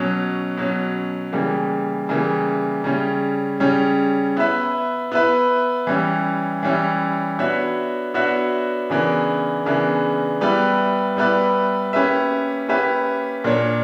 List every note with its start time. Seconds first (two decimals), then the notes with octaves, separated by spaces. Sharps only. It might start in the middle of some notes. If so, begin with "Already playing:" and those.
Already playing: B2 F#3 C#4
0.57 B2 F#3 C#4
1.33 C#3 E3 G3 A#3
2.09 C#3 E3 G3 A#3
2.84 C#3 G3 C#4
3.60 C#3 G3 C#4
4.37 B3 E4 B4 E5
5.12 B3 E4 B4 E5
5.87 E3 G3 C#4 E4
6.63 E3 G3 C#4 E4
7.39 B3 D4 F#4 C#5 E5
8.14 B3 D4 F#4 C#5 E5
8.90 C#3 E3 B3 D4 A#4
9.66 C#3 E3 B3 D4 A#4
10.41 G3 B3 E4 B4 D5
11.17 G3 B3 E4 B4 D5
11.93 A#3 C#4 G4 B4 E5
12.68 A#3 C#4 G4 B4 E5
13.44 A#2 A#3 D4 A#4 C#5